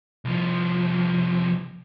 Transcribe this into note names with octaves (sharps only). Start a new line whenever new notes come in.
C2 F3